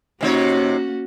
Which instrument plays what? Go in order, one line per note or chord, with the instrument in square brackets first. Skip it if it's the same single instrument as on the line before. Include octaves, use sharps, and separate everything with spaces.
[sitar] C3 D#4 C#5 [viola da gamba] A#3 C#4 F#4